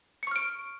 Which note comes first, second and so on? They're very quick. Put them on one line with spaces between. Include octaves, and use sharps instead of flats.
C#7 C#6 F6 D7